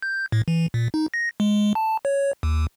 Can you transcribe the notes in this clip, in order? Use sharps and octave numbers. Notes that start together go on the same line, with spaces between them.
G6
A2
E3
A#2
D#4
A#6
G#3
A5
C#5
D#2